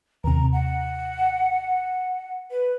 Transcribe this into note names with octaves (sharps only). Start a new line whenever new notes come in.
D#2 C3 A#5
F#5
B4